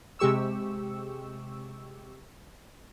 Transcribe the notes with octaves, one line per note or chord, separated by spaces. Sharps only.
C3 G#3 G4 C#6 E6